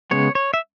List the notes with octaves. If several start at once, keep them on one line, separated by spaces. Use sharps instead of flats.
C#3 G#3 B3 C#5
C#5
E5